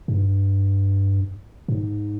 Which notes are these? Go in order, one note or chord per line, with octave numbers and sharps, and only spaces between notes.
G2
G#2